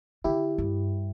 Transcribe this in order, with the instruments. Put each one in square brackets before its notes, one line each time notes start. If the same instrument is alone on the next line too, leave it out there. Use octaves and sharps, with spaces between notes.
[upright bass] D3 [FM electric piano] E4 G4
[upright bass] G2